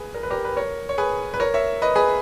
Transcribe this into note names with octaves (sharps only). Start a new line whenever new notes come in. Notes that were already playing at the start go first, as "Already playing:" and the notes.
Already playing: G#4 B4
A#4
B4
G4 A#4
B4
A#4 C#5
C#5
G#4 B4
B4
A#4 C#5
C#5 E5
B4 D#5
G#4 B4